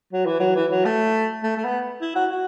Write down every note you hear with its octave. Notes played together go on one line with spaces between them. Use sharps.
F#3
E3
F#3
E3
F#3
A3
A3
A3
B3
E4
F#4
F#4